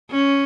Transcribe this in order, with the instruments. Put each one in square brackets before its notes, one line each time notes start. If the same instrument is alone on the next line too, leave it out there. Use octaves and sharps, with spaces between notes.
[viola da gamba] C#4